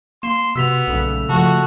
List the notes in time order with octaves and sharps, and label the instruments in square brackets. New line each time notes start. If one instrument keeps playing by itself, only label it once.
[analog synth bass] A#3 [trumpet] C6 [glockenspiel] E7
[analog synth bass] C3 [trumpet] B3 [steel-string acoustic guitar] F#4 [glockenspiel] E6 B6 F7
[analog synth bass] B1 [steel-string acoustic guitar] A#2 C#3 A3
[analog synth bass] C#3 [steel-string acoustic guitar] F3 A3 [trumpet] F#4 [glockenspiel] A5 C#6